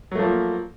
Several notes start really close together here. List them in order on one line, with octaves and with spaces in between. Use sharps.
F#3 A3 F3 A#3